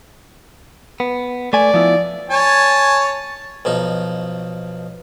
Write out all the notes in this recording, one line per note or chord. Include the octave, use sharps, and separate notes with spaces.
B3
A3 D5 G#5
F3 B3 E4
C#5 G#5 A5
B1 F3 D#4